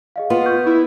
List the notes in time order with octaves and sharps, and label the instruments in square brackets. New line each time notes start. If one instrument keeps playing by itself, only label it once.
[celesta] G#4 D#5 F5
[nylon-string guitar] B3 [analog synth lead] F4
[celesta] C#6 G6
[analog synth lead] E4